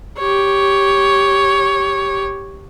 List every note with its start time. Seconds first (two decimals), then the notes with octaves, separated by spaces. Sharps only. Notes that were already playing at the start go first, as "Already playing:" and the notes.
0.18 G4 C#5